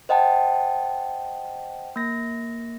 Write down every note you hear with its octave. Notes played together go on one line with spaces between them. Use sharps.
C5 D#5 F#5 G5 A5
A#3 A#6